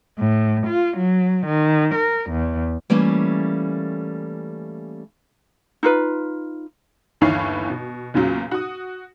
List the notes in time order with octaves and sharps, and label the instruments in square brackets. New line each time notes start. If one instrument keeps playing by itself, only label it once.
[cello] A2
F4
F#3
D#3
A#4
E2
[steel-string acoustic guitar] E3 G3 A3 A#3 C#4
[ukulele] D#4 F4 B4
[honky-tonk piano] G1 D#2 E3 C#5 F5 C7
B2
E2 A#2 C#3 F#3
F#4 D#6